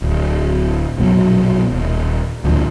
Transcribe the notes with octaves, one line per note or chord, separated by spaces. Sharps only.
D1
A#1 F#2 B2 F#3
D#1
D2 A#2 D3 F3